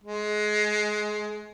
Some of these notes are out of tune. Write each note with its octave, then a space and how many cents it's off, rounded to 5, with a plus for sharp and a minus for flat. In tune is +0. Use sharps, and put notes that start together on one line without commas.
G#3 +20